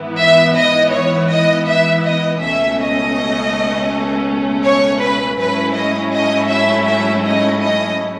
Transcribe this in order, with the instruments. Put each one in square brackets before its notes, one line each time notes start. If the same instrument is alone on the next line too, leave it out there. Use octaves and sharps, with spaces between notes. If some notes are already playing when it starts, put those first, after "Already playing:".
Already playing: [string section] G#2 E3 B3 E4
[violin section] E5
D#5
C#5
D#5
E5
D#5
[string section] C#2 B2 A3 C#4 [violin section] E5
[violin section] D#5
C#5
B4
[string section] G#2 F#3 A3 C#4 E4 [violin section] B4
[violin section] D#5
D#5
E5
E5
D#5
D#5